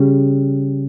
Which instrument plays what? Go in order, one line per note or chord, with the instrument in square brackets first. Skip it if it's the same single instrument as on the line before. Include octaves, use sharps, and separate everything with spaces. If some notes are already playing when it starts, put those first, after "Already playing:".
Already playing: [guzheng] C#3 G3